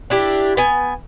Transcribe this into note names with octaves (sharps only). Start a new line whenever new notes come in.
D4 E4 G4
B3 G#5